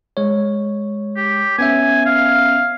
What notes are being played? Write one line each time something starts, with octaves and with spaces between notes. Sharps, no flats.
G#3 C#5
G4
B3 C#4 E5 G#5
F5